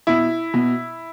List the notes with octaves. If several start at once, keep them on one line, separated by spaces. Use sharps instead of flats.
B2 E4
B2